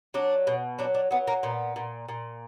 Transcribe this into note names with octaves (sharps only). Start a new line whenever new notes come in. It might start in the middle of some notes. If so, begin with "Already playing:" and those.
F#3 D4
B2
F#3 D4
D4
F#3 B3
A#3
A#2 B3
A#2
A#2